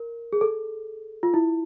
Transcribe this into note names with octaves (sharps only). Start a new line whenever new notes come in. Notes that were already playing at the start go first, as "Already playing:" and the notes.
Already playing: A#4
G#4
A4
F4
E4